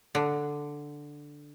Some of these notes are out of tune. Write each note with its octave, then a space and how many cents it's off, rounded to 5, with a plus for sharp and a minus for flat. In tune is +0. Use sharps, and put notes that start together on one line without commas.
D3 +0